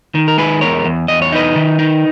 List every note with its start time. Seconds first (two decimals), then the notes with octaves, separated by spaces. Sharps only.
0.15 D#3
0.28 A#4
0.38 G#3 G#4 B4
0.61 E2 A#4 C#5
0.85 E2
1.08 E2 D#5
1.22 C#5
1.32 D#4 B4 D#5
1.56 D#3
1.79 D#4